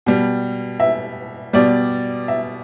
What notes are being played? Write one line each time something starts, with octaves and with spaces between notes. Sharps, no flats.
B2 G3
E5
B2 G3 D5
E5